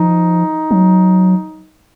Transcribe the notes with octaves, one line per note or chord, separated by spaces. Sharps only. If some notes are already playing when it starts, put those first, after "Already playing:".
Already playing: F3 D#4
F#3